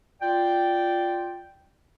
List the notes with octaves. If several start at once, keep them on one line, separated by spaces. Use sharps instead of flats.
F4 D5 G5